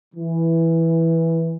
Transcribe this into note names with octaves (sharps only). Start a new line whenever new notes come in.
E3